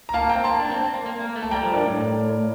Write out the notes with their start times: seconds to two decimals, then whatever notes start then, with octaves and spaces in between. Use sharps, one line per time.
0.09 A#5
0.14 A#3 F5 A5
0.29 C4 G5 A#5
0.44 A#3 A5 C6
0.59 D4
0.71 C4
0.83 C4
0.94 A#3
1.06 A#3
1.20 A#3
1.36 A3
1.42 A5
1.51 G3 G5 A#5
1.62 F3
1.73 G2 A#4 D5
1.86 A2